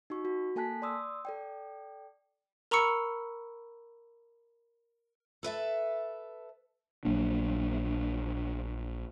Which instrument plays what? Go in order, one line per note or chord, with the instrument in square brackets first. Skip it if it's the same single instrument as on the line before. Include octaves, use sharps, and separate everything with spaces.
[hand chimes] D#4 F#4 C#6
F#4
A#3 A4 G#5 A5 F#6 B6
D5 C6 D#6 E6
A4 D5 G5
[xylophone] A#4 A#5 B5 C#6 E6 C#7
[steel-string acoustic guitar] A4 B4 E5 A5
[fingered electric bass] A#1 F#3 A#3 D4